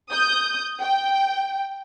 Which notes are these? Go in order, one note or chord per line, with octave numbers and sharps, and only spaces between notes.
D#6 G6
G5